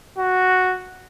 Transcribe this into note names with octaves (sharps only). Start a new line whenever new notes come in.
F#4